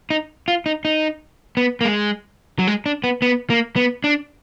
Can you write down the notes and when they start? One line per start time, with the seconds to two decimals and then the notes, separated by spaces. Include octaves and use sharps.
0.10 D#4
0.48 F4
0.66 D#4
0.85 D#4
1.57 B3
1.81 A#3
1.85 G#3
2.59 F#3
2.67 G#3
2.86 D4
3.04 B3
3.22 B3
3.50 A#3
3.76 B3
4.04 D4